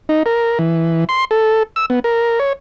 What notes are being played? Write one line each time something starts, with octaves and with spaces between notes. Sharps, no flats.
D#4
A#4
E3
C6
A4
E6
B3
A#4
C#5